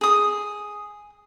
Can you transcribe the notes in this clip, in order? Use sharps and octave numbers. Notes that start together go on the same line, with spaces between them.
G#4 D#6